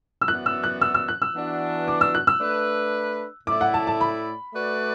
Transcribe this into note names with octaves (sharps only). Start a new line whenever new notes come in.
E6
F#2 E3 B3 F#4 D5 F#6
E6
F#6
E6
E6
F#6
E6
E3 B3 D4 F#4
D6
E6
F#6
E6
A3 D4 B4
A2 A3 E4 D5 D6
F#5
A5
A5
B5
A3 F#4 B4 D5